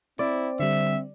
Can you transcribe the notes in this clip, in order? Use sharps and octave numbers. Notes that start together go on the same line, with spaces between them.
C4 E4 D5
D3 G3 E5